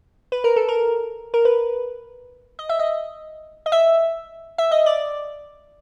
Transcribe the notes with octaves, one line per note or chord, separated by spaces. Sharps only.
B4
A#4
A4
A#4
A#4
B4
D#5
E5
D#5
D#5
E5
E5
D#5
D5